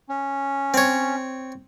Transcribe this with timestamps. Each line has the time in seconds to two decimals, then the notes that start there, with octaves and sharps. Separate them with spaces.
0.09 C#4
0.74 C4 C#5